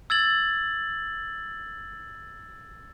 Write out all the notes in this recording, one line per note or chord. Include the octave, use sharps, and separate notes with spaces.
E6 G#6 A6 F#7